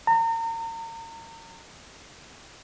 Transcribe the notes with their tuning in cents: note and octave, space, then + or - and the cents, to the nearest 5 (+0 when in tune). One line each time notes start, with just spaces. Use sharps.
A#5 -35